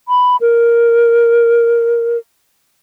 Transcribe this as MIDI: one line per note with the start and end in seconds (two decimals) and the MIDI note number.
0.08 0.36 83
0.41 2.18 70